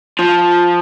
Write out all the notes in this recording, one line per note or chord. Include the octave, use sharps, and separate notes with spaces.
F3